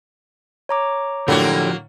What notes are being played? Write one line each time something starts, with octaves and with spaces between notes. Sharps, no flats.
C#5 A#5 D6
A2 D3 F3 F#3 A#3 F#4 G4